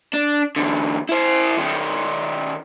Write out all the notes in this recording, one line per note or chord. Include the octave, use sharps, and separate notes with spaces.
D4
E2 D3
E4 C5
D#3 C#4